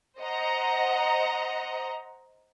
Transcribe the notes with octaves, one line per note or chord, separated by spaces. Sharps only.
C5 D#5 F#5 A#5